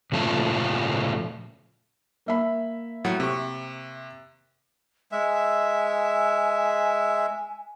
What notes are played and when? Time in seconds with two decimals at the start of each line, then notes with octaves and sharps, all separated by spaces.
0.12 A#2 C#3 F3 A3 A4
2.26 A#3 E5 B5
3.04 A2 F#3 F#5
3.20 C3 C#6
5.12 G#3 E5 G#5